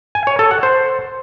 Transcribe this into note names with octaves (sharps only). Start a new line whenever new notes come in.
G#5
C#5
A4
F#5
C5